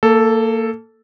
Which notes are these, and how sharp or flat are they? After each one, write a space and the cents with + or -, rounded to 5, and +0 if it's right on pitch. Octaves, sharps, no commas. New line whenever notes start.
A#3 -25 A4 +0